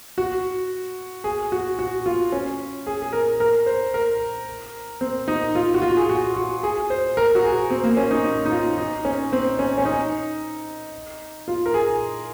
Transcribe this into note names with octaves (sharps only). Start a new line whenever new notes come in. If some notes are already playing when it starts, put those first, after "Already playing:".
F#4
G#4
F#4
F#4
F4
C#4
G#4
G#4
A#4
A#4
C5
A#4
C4
D#4
F4
F#4
F4
G#4
F#4
F#4
G#4
C5
A#4
F#4
G#4
C4
A#3
C#4
D#4
D#4
D#4
F4
D#4
C#4
C4
C#4
C#4
D#4
F4
A#4
G#4